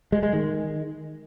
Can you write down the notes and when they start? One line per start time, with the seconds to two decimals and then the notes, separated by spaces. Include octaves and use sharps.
0.12 G#3
0.23 G#3
0.33 D#3